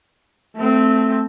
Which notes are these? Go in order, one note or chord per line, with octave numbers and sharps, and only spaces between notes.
A3 C4